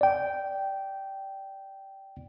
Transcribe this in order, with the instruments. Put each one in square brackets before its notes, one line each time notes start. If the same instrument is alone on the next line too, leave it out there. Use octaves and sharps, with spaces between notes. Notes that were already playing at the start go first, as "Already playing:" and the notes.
[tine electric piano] D5 G5